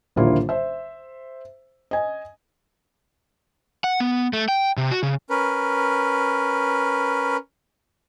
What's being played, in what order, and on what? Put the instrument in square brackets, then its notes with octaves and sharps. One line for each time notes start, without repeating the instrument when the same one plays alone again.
[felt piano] D#1 A#1 D3 A#3 E4 F4
C5 E5
D#5 G#5
[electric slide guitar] F#5
B3
A3
G5
C3
F#4
C#3
[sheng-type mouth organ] C#4 A#4 B4